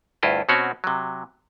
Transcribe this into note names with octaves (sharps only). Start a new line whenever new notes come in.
D2 G2 E4 F4 D#5
B2 C4 C#4 F#4 C#5 F#5
C3 F#3